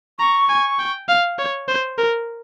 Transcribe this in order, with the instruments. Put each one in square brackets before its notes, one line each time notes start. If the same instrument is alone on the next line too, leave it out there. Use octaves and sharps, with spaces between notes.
[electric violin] A#5 [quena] C#6
[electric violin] G#5
G5
F5
C#5
C5
A#4